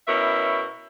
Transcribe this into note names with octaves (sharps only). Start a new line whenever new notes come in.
B2 C#4 E4 A#4 E5